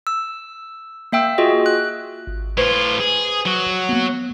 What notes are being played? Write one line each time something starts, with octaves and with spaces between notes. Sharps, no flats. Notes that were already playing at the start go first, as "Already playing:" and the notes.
E6
A#3 E5 G5 E6
F4 F#4 G#4 D#5
F#6
G#1
A2 F4 B4 C5 G#6
G#4
F#3 F#4
A#3 B3